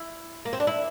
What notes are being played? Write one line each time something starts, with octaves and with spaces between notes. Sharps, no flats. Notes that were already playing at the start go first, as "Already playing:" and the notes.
Already playing: E4
A#3
C4
D4
E4